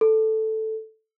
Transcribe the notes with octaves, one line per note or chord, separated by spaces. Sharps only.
A4